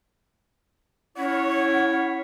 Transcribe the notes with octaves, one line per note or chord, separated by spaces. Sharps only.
C#4 E4 C#5 F#5